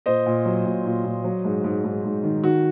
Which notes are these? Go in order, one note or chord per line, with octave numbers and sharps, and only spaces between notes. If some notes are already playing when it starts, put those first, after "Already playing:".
A#2 C5 D#5
A#2
F#3
A#2
A#2
A#2
F#3
G#2
G#2
G#2
G#2
D#3
D#3 F#4